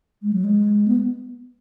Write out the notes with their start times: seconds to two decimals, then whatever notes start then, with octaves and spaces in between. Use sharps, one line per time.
0.23 G#3
0.33 F#3
0.44 G#3
0.88 B3